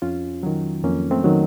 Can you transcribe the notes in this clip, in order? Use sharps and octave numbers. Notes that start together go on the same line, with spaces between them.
F2 C#4 F4
D#3 F#3
F2 A#3 C#4
A3 C4
D#3 F#3